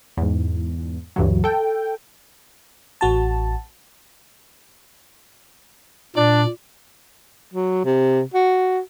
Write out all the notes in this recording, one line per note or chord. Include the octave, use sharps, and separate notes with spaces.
E2 G#2
D2 G2 E3 F#3
A4 G5
A1 F#4 A5
A#2 D4 D5
F#3
C3
F#4